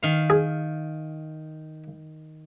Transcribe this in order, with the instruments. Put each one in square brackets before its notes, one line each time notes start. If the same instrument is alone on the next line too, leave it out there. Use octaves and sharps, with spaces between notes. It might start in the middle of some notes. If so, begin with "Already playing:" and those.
[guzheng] D#3 F5
[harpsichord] G#4